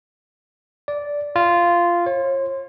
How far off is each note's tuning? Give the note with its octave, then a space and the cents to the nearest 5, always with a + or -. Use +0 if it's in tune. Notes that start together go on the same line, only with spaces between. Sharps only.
D5 -10
F4 -10
C#5 -40